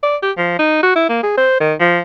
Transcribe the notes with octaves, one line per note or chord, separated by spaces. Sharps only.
D5
G4
F3
D#4
F#4
E4
A#3
G#4
C5
D#3
F3